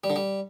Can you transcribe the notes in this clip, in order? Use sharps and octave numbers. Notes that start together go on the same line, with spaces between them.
G3
D3
G3